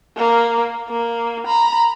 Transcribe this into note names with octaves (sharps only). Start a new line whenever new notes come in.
A#3
A#3
A#5 B5